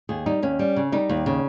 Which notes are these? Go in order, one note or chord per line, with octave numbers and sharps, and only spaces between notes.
D#2 G#4
G3 D#4
D#2 C#4
G3
C#3
G3 D#4
D#2
C#3